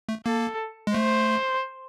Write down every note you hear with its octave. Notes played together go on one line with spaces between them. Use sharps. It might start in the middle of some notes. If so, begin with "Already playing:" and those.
A3
A#3 A4
G#3
A3 C5